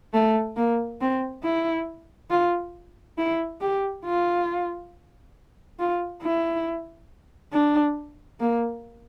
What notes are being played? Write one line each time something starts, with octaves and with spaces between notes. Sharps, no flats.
A3
A#3
C4
E4
F4
E4
G4
F4
F4
E4
D4
A#3